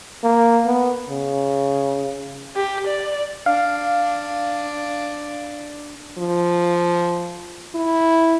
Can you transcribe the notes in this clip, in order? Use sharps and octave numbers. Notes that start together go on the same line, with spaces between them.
A#3
B3
C#3
G4
D5
D4 F5
F3
E4